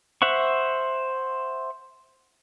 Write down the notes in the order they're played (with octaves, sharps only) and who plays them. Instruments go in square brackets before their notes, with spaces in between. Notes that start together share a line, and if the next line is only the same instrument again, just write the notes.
[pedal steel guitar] C5 E5 F#5 C#6